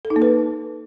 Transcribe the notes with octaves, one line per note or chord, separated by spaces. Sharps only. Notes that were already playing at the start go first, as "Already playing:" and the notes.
A4
D#4
A#3
B4